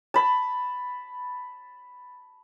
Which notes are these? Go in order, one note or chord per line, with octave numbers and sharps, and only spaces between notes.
A5 B5